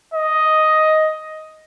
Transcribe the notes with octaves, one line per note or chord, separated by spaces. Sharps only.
D#5